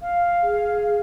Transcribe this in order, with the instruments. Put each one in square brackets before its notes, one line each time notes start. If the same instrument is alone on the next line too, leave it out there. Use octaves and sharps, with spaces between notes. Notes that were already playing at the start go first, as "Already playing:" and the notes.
[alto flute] F5
[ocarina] G#4